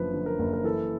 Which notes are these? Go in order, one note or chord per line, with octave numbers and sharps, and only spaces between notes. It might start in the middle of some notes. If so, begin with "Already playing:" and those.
Already playing: F#1 F#2 D3 F3 B4
D3
A#4
F#1
A#4
E3 A4